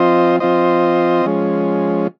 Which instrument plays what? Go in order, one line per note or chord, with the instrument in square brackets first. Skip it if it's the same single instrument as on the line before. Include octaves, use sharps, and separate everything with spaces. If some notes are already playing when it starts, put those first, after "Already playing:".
Already playing: [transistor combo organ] F3 C4 F4 C5 D#5
F3 C4 F4 C5 D#5
F3 G#3 C#4